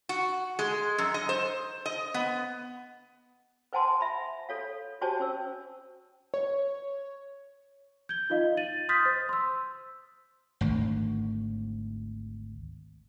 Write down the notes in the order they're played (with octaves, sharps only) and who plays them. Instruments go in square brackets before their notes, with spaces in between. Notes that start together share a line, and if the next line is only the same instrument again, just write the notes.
[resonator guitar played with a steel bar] F#4
G#3
F#2
D#5
C5
D#5
B3
[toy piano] B4 C5 F#5 G#5 A5 C6
E5 B5
A4 C#5 F5
F#4 G4 C5 C#5 G#5 A5
C#4 C5 E6
[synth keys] C#5
[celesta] G6 G#6 G7
D#4 F4 D#5 F5
A6 D#7 F#7
C6 D#6 F6 G6 A6 B6
C5
C6 E6
[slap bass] G#1 D2